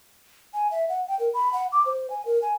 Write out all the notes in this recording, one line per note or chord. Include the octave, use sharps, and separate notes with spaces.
G#5
E5
F#5
G5
A#4
B5
F#5
D6
C5
G#5
A#4
G#5